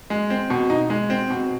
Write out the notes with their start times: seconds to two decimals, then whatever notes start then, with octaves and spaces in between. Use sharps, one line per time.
0.10 G#3
0.30 C4
0.50 B2
0.70 D#4
0.90 G#3
1.10 C4
1.30 B2